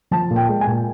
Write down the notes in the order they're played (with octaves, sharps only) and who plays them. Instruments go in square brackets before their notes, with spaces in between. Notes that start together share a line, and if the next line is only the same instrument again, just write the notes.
[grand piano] F3 A5
A#2
G5
G#3
G#5
A#2